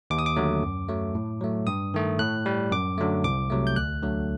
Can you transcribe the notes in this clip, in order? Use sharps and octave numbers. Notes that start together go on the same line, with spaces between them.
D#2 D6
D#6
D6
D3 F#3 A3
F#2
F#3 A3
A2
F#3 A3
G2 D#6
D#3 A3
A2 F#6
G3
F#2 D6
D3 F#3 A3
C2 D6
C3 F#3 A3
G6
D2 F#6
D3 F#3 A3